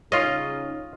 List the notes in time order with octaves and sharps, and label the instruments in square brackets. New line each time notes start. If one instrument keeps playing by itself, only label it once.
[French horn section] C#3 D#4 [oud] C#4 [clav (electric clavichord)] F4 D#5